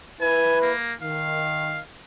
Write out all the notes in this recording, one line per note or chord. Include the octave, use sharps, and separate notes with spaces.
E4 B4 G#5
A#3
D#3 F5